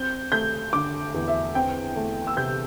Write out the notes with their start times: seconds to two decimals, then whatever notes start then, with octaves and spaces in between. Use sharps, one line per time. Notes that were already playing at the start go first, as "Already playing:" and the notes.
Already playing: C4 G6
0.32 A3 G6
0.73 D3 D6
1.14 E2
1.28 E5
1.55 C4 G5
1.96 A3
2.27 E6
2.37 C3 G6